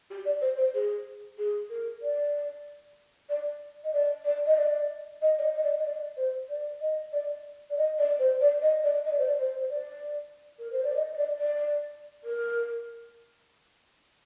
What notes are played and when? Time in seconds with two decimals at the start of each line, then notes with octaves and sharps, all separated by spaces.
0.10 G4
0.25 D5
0.41 C5
0.57 C5
0.74 G#4
1.38 G#4
1.70 A#4
2.02 D5
3.29 D5
3.84 D#5
3.93 D5
4.25 D5
4.46 D#5
4.56 D5
5.21 D#5
5.38 D5
5.42 D#5
5.55 D#5
5.63 D5
5.78 D#5
5.85 D5
6.17 C5
6.49 D5
6.80 D#5
7.12 D5
7.70 D5
7.77 D#5
7.98 D5
8.19 C5
8.41 D5
8.61 D#5
8.83 D5
9.05 D#5
9.11 D5
9.18 C5
9.26 D5
9.37 C5
9.59 C5
9.69 D5
10.59 A#4
10.72 C5
10.84 D5
10.95 D#5
11.11 D#5
11.17 D5
11.38 D5
12.24 A#4